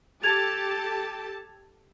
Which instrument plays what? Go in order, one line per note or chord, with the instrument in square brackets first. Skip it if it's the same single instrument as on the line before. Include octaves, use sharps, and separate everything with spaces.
[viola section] G4 A4 A5 [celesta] G#6 F7